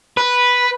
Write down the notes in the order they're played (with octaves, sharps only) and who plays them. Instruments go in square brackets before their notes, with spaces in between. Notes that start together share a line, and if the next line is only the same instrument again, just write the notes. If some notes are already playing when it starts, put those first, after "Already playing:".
[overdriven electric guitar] B4